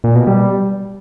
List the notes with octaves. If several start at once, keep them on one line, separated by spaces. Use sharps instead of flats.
A#2
B2
G3